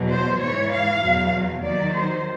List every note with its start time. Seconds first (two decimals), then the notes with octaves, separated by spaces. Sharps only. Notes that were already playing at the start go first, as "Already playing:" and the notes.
Already playing: E2 B2 F#3
0.09 C5
0.40 G#2 E3 C#5
0.70 F5
1.01 E2 B2 F#3
1.62 D#2 D#3 F#3 D5
1.94 C5